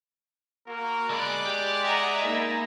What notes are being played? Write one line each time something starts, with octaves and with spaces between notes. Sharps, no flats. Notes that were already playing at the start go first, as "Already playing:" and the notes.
A#3 F#4 A#4
D3 G#3 B3 D5 D6 F#6
G4
D#5 E5 F#5 A#5
A#3 D#4 E4